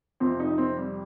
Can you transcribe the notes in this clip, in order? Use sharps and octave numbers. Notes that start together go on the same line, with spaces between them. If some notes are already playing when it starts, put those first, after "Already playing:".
F2 C3 F3 C4
D#4
C4
G3